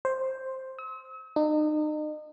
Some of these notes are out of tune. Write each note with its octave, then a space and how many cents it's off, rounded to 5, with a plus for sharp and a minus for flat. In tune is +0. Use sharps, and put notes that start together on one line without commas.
C5 +5
E6 -45
D#4 -35